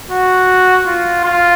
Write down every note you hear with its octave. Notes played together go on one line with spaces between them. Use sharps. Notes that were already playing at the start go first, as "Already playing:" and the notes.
F#4
F4
F4